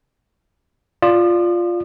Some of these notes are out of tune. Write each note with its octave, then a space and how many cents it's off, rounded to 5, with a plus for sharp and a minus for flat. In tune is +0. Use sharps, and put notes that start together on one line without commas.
F4 +0 D5 +0 D#6 -45